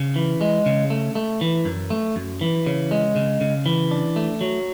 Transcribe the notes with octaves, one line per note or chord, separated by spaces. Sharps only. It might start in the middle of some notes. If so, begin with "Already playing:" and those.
Already playing: C#3
E3
G#3
C#3
A3
A3
E3
F#2
A3
F#2
E3
C#3
G#3
C#3
C#3
E3
D4
A3
F#3